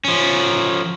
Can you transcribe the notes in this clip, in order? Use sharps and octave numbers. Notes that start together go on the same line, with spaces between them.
F3 C#4